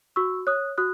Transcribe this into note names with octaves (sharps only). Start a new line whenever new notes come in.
F#4 C#6 E6
C#5 D#6 F#6
F#4 D#6 F#6